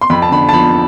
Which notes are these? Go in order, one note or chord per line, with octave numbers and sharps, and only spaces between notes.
C6
F2 B5
A5
D3 B5
A5
F3 B5